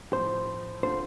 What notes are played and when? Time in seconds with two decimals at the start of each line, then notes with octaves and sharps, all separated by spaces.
0.13 A2 F3 C4 C5
0.83 D3 A3 C4 F4 C5